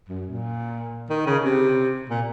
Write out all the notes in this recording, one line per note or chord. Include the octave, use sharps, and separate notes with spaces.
F#2
A#2
D#3
C#3
C3
A#2